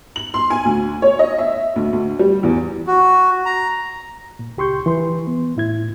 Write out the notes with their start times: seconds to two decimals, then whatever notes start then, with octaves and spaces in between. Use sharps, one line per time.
0.16 F#7
0.34 C6
0.50 G#5
0.65 D2
1.02 C#5
1.19 D#5
1.38 E5
1.76 D2
1.93 D2
2.19 G3
2.43 E2
2.87 F#4
3.46 A#5
4.39 A#2
4.57 C#2 G4 C6 C#6 G6
4.86 E3 B4 C6
5.27 B3
5.56 A2 E4 G#6